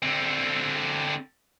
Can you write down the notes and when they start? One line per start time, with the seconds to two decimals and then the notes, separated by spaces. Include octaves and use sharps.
0.02 D3 C4